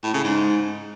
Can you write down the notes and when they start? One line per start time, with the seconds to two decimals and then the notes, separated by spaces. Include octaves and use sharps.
0.04 A2
0.14 C#3
0.24 G#2